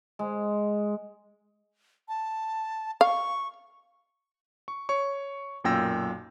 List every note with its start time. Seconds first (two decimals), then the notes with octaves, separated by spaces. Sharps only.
0.19 G#3
2.09 A5
3.01 F5 C#6
4.68 C#6
4.89 C#5 C#6
5.64 B1 F#2 A#2 G5 E6 A#6